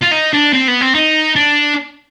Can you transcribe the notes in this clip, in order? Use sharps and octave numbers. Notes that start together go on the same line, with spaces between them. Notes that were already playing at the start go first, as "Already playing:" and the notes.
F4
D#4
D4
C4
B3
C4
D#4
D4